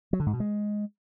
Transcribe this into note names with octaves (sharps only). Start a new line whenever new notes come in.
F#3
D3
G#2
B2
G#3